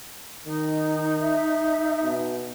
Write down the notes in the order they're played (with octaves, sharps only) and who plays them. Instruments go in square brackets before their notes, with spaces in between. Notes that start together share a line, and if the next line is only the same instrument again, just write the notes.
[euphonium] D#3 [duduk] D#4
[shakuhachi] E5
[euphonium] B2